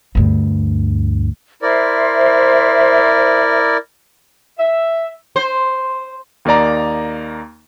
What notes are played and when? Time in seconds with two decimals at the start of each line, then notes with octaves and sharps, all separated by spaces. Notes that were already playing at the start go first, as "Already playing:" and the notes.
0.15 D2 G2
1.62 E4 A#4 C5 D5 E5
4.59 E5
5.36 C5
6.45 D#2 A#3 D#4 D5 A#5